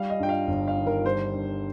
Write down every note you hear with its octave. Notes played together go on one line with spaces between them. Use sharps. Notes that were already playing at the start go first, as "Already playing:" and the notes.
Already playing: G3 F5
D#5
G2 G5
F5
G1
F5
D#3
A#4
G3 C5
G2